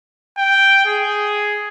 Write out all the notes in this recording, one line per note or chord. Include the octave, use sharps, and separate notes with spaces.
G5
G#4